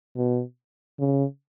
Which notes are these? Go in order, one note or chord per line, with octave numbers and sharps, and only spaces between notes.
B2
C#3